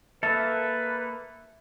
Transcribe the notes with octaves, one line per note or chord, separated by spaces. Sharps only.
A#3 A4 B4 E5